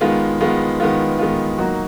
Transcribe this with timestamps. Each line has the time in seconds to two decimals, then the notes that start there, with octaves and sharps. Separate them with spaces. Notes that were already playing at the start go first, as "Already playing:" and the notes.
0.01 D#3 G#3 B3 F4
0.41 D#3 G#3 B3 F4
0.80 D#3 G#3 B3 F4
1.19 D#3 G#3 B3 F4
1.58 F#3 A#3 D#4 F#4